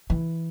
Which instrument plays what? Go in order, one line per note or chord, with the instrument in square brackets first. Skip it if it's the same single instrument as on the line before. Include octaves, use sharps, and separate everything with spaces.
[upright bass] E3